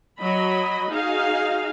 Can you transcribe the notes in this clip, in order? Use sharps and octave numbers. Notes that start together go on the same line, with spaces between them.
F#3 D#5 B5
D#4 F#4 G#4 F5